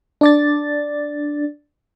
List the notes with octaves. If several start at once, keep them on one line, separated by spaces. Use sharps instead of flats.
D4 D5 A6